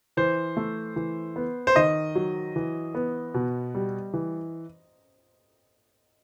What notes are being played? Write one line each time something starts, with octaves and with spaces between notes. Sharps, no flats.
E3 C5
A3
E3
B3
C5
D#3 D#5
F#3
E3
B3
B2
G3
E3